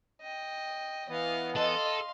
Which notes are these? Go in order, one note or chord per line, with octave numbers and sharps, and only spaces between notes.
D#5 G5
E3 B3 D#5 F5
A4 D#5 F5 C6